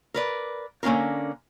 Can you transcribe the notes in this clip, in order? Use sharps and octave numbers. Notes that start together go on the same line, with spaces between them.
A#4 B4 D5
D3 A#3 C#4 F4 A#4